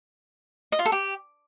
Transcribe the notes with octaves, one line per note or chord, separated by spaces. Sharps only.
D#5
F4
A4
G4